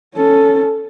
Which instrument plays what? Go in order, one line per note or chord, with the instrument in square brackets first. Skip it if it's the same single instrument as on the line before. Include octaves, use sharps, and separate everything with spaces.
[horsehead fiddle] C#4 A4